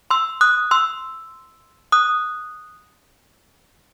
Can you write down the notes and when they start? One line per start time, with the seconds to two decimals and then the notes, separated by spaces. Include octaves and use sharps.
0.11 C6 E6
0.41 D#6 F#6
0.71 C6 E6
1.92 D#6 F#6